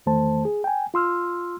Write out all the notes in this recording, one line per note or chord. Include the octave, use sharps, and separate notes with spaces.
E2 D#3 A3 C5 A5
G#4
G5 G#5
F4 C6 E6 F6